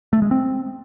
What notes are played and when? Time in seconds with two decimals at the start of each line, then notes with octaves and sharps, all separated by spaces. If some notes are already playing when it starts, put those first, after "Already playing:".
0.13 A3
0.22 G#3
0.31 C4